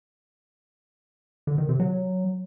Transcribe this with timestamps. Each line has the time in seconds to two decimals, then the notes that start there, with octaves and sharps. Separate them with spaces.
1.47 D3
1.58 D#3
1.69 C3
1.80 F#3